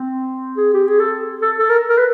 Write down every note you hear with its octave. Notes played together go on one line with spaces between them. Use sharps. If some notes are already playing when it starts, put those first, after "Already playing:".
Already playing: C4
G#4
G4
G#4
A4
A4
A4
A#4
A#4
B4